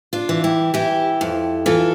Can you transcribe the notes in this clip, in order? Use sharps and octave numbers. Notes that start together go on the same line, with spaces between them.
D4 F4
E3
E4 G4
E3 E4 G4
F2
E3 F4 A4